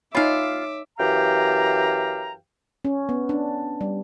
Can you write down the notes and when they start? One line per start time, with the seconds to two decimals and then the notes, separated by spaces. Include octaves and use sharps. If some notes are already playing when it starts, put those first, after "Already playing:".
0.15 D#4 F4 C#5 E5 F5 G#5 B5 D6
1.00 F#2 E3 G4 F5 G5 A#5
2.85 C#4
3.09 B3
3.29 D4
3.81 G3